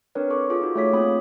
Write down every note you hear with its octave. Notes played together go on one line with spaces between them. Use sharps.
C4 D4 A#4 B4 C#5
A4 C#6 D6
F4 G#4 A4 D6
D#4 F#4
A3 G#4 A4 C#5 D6 B6
A#3 C4 F4 B5 D#6